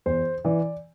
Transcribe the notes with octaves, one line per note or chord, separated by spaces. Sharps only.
E2 C5
E3 D5